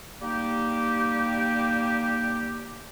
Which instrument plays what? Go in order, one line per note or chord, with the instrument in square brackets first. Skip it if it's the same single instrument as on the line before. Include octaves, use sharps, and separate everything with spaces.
[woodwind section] G3 A#3 D#4 G4